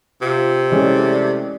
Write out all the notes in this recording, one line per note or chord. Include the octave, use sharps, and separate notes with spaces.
C3 F4
E3 G#3 A3 C#4 E4 D5